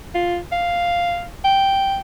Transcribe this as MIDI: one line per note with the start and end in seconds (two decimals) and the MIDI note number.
0.15 0.38 65
0.52 1.26 77
1.44 1.99 79